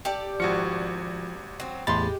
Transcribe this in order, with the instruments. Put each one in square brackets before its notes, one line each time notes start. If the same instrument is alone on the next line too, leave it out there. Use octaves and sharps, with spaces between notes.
[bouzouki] G4 A4 D5
[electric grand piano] G#1 F#4 C#7 [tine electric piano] F3
[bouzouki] F#3 C4
[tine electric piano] E2 A2 A6 [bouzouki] G#3 G4 [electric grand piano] B5 C6